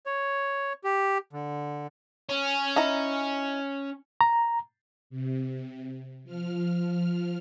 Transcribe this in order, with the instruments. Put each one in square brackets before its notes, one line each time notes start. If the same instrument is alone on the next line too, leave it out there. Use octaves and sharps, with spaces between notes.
[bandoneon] C#5
G4
D3
[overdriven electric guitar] C#4
[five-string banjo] D#4 E4 A#5
[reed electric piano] A#5
[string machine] C3
F3 F6